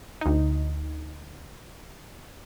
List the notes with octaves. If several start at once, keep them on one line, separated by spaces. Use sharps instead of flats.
D2 D#4